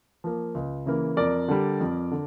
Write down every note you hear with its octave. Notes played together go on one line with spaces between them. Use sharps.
F3 A#3
C#2
C#3 E3 A#3
F2 A#4 D5
D3 G3
F2
D3